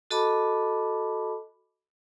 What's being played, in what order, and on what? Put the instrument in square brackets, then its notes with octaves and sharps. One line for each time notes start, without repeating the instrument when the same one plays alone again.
[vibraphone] F#4 A4 D#5 A5 B5 D6